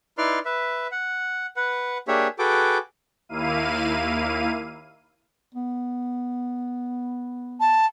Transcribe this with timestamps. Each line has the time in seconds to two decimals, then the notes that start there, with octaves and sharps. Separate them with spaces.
0.18 D#4 E4 B4 D5 C6 F6
0.45 B4 E5
0.92 F#5
1.56 B4 F#5
2.08 A#3 D4 G4 G#4 C#5 E5
2.39 F#4 G#4 A4 B4 G5 D6
3.29 D#2 A#3 E4 F5 D#7
5.55 B3
7.60 A5